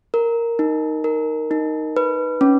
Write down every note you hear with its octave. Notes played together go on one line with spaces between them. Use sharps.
A#4
D#4
A#4
D#4
B4
C#4